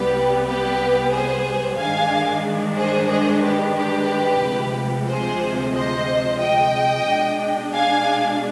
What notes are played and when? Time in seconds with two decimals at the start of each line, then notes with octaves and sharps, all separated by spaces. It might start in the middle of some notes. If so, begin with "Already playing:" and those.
Already playing: C2 C3 G3 B3 G4 B4
0.45 G4 B4
1.11 G#4 C5
1.77 G2 D#3 G#3 D4 F5 G#5
2.77 G#4 C5
3.09 G#4 C5
3.42 G4 B4
3.76 G4 B4
4.42 D2 C3 F3 G#3
5.08 G#4 C5
5.74 C5 D#5
6.40 D#5 G5
7.07 B2 G#3 D4
7.73 F5 G#5